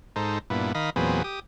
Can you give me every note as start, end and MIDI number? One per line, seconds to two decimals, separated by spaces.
0.16 0.39 44
0.16 0.39 63
0.16 0.39 69
0.16 0.39 72
0.50 0.72 43
0.50 0.72 46
0.50 0.72 59
0.50 0.72 64
0.75 0.90 51
0.75 0.90 75
0.75 0.90 77
0.75 0.90 83
0.96 1.23 40
0.96 1.23 46
0.96 1.23 54
0.96 1.23 60
0.96 1.23 68
0.96 1.23 71
1.24 1.40 67
1.24 1.40 87